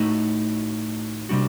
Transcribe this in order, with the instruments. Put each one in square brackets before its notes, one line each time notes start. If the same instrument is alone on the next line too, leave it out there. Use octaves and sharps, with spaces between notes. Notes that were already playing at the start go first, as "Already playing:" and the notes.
Already playing: [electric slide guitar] A2 A3 D#4 F#4
C3 G3 D4 F#4